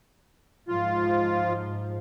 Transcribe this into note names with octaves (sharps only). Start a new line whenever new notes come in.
G#2 F3 F4